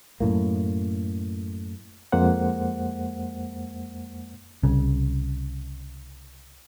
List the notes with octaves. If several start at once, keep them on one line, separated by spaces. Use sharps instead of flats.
F#2 A2 A#3
F2 G#3 A#3 C5 F#5
C2 C#3